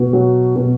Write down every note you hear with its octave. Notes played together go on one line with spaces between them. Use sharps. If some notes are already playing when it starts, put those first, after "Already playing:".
Already playing: B2
F#3
B2